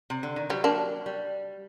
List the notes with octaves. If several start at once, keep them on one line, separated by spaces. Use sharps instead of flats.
C3
D3
D#3
F#3 G3
A#3 D4
G3